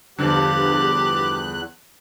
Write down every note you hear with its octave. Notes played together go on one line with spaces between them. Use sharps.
E2 G2 D3 F3 G4 F#6